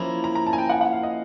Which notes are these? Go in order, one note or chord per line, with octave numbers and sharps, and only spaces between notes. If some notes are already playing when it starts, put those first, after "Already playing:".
Already playing: F3 A#3 C#4 E4 A#5
A#5
A#5
A5
G#5
G5
F#5
F#5
F5
D#5